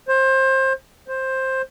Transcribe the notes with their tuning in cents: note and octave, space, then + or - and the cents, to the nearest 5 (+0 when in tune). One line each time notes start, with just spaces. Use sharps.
C5 +25
C5 +10